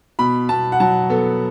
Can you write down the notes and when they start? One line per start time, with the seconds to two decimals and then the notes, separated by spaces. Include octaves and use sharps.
0.19 B2 B5
0.49 B2 A5
0.72 F#5
0.80 F#3 A5
1.10 B3 A4